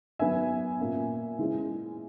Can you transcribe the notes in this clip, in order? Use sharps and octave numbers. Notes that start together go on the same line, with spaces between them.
D#3 F#3 B3 E5 G#5
A#2 A#3 C#4
E3 G#3 C#4